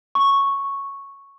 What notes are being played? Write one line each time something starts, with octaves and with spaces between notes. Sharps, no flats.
C#6